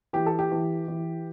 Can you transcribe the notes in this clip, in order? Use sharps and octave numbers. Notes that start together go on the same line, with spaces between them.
E3 G4
A4
G4
E3
E3